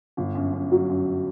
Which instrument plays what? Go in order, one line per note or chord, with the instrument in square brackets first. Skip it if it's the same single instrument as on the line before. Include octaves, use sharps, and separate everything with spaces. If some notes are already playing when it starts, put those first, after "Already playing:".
[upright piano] G1
F#2
F#2
F#3
F#2